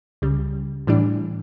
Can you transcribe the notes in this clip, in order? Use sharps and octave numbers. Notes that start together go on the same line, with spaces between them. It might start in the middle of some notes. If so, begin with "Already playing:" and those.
C#2 C#3 G3
A2 E3 G3 D4